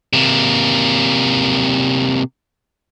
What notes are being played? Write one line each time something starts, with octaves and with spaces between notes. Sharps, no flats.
C3 A#3